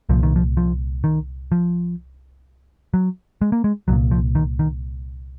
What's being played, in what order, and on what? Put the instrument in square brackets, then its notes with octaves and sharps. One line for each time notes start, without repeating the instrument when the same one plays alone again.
[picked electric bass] C2 A#2 F3
D#3
F3
F3
D#3
F3
F#3
G#3
A#3
G#3
C2 A#2 F#3
F3
D#3
D#3